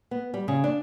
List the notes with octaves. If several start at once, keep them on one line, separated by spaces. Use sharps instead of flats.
B3
G3
C#3
D4